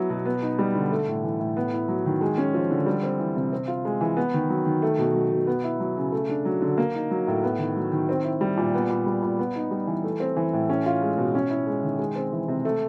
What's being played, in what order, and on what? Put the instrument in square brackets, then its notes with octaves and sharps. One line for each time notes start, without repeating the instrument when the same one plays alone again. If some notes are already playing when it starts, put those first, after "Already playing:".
Already playing: [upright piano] F#3 B3 E4
B2
B3
D#4
G3
D3
A3
A2
E3
A2
B3
E4
F#3
D#3
G#3
C#4
F3
D3
G3
C4
E3
C3
C4
F4
G#3
E3
B3
D#3
F#3
D#3
A3
B2
F#3
B2
B3
E4
F#3
C#3
A3
D4
F#3
D3
A#3
D#4
F#3
A2
B3
D#3
F#3
D#3
C4
E4
G3
A#2
B3
A#2
G3
A#2
B3
D#4
G3
E3
A3
C4
E3
A2
C#4
F4
G#3
B2
C#4
E4
G#3
D#3
G#3
C4
E3
C3
A3